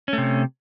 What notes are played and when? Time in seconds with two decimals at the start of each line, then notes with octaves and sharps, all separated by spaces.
0.08 C#4
0.13 A3
0.18 C3